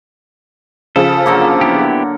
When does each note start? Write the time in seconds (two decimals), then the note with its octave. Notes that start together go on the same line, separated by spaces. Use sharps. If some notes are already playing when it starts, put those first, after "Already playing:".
0.96 C#3 F3 A4
1.26 D3 F#3 A#3
1.61 B3 E4 G4